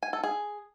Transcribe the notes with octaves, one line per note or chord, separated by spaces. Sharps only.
G#5
A4
G#4